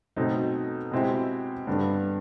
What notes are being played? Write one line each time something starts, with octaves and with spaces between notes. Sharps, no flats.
B2 F#3 A3 C4 D#4
B2 G#3 C4 E4 G4
G2 D3 G3 B3 D4